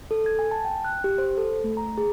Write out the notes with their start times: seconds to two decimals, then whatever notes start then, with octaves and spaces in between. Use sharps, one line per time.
0.11 A4
0.26 G#6
0.39 G#5
0.51 A5
0.65 G5
0.85 F#6
1.04 G4
1.18 C5
1.38 A4
1.64 A3
1.77 A#5
1.98 G#4